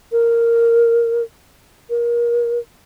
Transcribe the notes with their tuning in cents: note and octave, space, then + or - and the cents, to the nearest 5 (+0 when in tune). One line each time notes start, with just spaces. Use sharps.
A#4 -5
A#4 +25